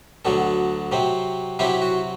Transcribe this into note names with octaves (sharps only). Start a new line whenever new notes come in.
D2 D3 F#3 A4
C3 F#3 C4
C3 F#3 C4 E4 G4
F#4